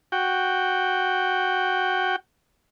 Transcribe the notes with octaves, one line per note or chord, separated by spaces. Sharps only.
F#4 G5